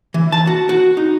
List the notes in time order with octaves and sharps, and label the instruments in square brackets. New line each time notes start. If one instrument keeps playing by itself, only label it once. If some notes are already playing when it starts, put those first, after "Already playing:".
[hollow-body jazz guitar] E3
A5
F#4
F#4
D#4